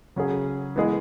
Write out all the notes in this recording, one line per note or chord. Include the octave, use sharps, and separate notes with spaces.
C#3 F#3 C#4 G#4
E3 G#3 B3 G#4